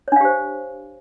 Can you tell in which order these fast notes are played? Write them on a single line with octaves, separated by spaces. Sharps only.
C#5 D4 F5 G4 C5